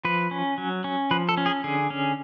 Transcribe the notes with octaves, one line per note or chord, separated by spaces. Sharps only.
F3 B4
C#4
F#3
C#4
F3 B4
A4
C#4
G#4
D3 G#4
C#4